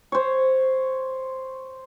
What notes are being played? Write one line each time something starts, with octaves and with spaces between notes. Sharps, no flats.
C5 C#5